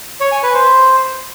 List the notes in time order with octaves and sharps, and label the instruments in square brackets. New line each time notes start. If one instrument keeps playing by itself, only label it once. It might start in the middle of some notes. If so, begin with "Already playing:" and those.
[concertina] C#5
G#5
B4
C5